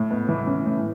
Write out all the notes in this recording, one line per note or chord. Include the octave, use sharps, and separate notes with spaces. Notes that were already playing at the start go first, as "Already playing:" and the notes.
Already playing: A2
B3
E3
C#4
A2